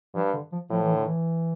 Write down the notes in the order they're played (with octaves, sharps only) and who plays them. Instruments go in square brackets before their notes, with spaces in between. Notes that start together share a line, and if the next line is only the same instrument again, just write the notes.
[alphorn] G2 [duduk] F3
[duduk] D3
F3
[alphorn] A2 [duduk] F3
[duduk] E3
D3
E3